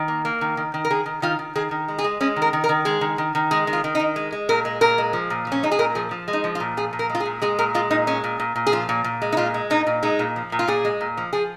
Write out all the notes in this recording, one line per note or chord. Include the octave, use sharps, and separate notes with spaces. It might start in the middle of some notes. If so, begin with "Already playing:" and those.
Already playing: D#3
A#3
A#3
D#3
D#3
D#3
A#4
D#3 G#4
D#3
D#3 F4
D#3
D#3 G#4
D#3
G#3
G#4
G#3
G#3 C#4
D#3
A#4
D#3
A#4
D#3
G#3 G#4
D#3
D#3
D#3
G#3 G#4
D#3
F4
D#3
D#4
D#3
G#3
G#3
A#2 A#4
G#3
A#2 A#4
G#3
F3
A#2
F3 C#4
G#3 D#4
G#4
A#2 A#4
F3 G#4
F3
G#3
D#4
F3
F4
A#2
F3 G#4
A#2
A#4
G#3
F4
G#4
A#2
G#3 G#4
A#2 A#4
G#3 F4
A#2 D#4
G#3 C#4
A#2
A#2
A#2
G#4
F3 F4
A#2
A#2
G#3
D#4
A#2 F4
G#3
A#2 D#4
A#2
G#3 D#4
A#2
F3
A#2
F4
A#2 G#4
G#3
A#2
F3
F3 G#4